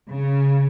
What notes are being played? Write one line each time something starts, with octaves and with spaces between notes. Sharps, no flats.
C#3